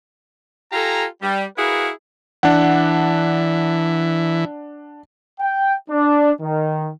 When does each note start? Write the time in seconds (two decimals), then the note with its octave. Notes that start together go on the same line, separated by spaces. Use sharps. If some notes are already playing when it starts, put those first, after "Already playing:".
0.72 F4 G4 A4 G#5 A#5
1.21 G3
1.57 E4 F#4 G#4 A#4 B4 F5
2.43 E3 D4 F#5
5.40 G5
5.89 D4
6.40 D#3